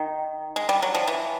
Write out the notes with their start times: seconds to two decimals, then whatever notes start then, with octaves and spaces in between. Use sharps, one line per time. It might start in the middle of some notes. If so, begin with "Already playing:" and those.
Already playing: D#3
0.56 G#3
0.69 G3
0.82 F#3
0.95 F3
1.07 E3